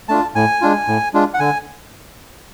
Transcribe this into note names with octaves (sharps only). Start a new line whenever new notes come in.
A3 D4 F4 A5
A2 G#5
G#3 D4 F4
A2
G#3 D4 F4
F#5
D3 G#5